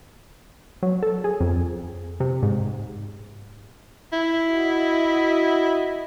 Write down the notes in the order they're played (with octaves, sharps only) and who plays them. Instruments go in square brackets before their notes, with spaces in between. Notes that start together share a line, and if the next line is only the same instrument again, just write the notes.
[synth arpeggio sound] F#3
A4
G#4
F2
C3
G#2
[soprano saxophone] E4
[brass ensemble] F#4 D#5